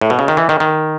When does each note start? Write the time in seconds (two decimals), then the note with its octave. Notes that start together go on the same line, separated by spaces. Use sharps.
0.01 A2
0.10 B2
0.19 C#3
0.28 D#3
0.37 E3
0.49 D#3
0.60 D#3